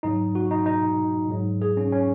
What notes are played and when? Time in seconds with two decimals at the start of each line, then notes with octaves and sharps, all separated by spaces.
0.03 G#2 F#3 D#4
0.35 F#4
0.51 D#4
0.66 D#4
1.29 G#2 F#3
1.62 G#4
1.77 C#4
1.92 C#4